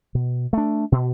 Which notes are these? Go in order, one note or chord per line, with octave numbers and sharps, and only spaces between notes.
B2
A3 D4
B2